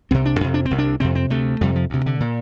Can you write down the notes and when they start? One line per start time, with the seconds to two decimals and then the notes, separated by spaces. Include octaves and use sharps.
0.11 C2 C3 C4
0.26 D4
0.41 F2 C3
0.54 D4
0.66 C4
0.71 C2 C3
0.79 D4
1.00 F2 C3 C4
1.15 C4
1.30 D2 C3 A3
1.61 F2 C3 G3
1.76 F3
1.90 D2 C3
2.06 D3
2.20 A#2